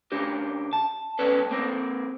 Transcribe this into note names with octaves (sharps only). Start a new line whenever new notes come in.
C#3 D4 G4 A#4
A5
C2 G2 B3 C#4 A4 B4
A#3 C4 A#4